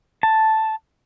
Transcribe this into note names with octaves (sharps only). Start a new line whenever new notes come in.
A5